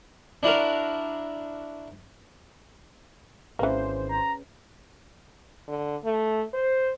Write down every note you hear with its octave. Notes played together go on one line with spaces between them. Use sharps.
D4 E4 F#4 A#4
G#1 E3 A#3 C#4 G#4 B4 C5
A#5
D3
A3
C5